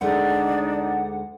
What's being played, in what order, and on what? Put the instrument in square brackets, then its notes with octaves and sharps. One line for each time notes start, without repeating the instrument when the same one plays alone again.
[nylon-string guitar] D2 G#3 A3 [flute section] D4 D#4 [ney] D5 [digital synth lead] F#5